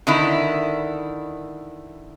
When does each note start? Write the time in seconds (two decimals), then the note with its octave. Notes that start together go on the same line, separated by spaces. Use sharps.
0.07 D3 D#3 E4